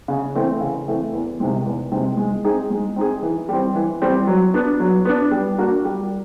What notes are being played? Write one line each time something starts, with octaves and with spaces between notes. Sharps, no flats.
C#3
E3 A3 C4
C#3
E3 A3 C4
E2
C3 D#3 G#3 C4
E2
C3 D#3 G#3 C4
G#3
C4 D#4 G#4
G#3
C4 D#4 G#4
E3
G3 C4
E3
G3 C4
F#3
B3 D4
F#3
B3 D4
G3
A#3 D4 F#4 A#4
G3